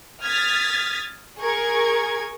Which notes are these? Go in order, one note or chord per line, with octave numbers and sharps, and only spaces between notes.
D#6 F6 G#6 A6 B6
G#4 A#4 C#6 G#6